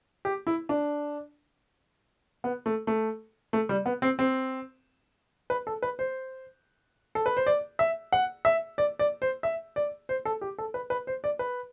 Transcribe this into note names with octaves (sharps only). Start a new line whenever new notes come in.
G4
E4
D4
B3
A3
A3
A3
G3
B3
C4
C4
B4
A4
B4
C5
A4
B4
C5
D5
E5
F#5
E5
D5
D5
C5
E5
D5
C5
A4
G4
A4
B4
B4
C5
D5
B4